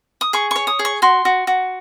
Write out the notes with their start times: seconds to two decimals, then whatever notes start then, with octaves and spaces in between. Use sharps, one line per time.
0.21 D#6
0.33 G#4 C#6
0.51 C#5 C#6
0.67 D#6
0.79 G#4
0.85 C#6
1.02 F#4 C6
1.25 F#4
1.47 F#4